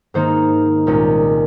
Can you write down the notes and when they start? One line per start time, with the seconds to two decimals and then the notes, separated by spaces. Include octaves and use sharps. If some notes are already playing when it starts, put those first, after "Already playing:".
0.14 G#2 D#3 A#3 D#4 C5
0.87 C2 A#2 G#3 C#4